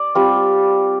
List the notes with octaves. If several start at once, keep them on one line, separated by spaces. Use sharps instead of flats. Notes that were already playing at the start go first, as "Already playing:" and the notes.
Already playing: D5
G3 C4 F4